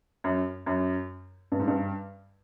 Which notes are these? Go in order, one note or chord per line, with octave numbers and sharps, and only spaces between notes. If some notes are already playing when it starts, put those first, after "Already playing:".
F#2
F#2
G2
G#2
G2